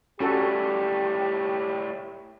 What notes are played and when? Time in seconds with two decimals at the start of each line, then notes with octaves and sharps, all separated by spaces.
0.20 A2 G3 C#4 F#4 G4 A4